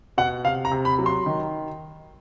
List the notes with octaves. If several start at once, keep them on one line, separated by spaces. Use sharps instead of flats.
B2 F#5
C3 F5
A#5
C3
B5
F#3
C6
D#3